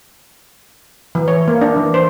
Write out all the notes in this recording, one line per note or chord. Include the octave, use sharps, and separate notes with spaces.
E3
C#5
A#3
D4
E3
C5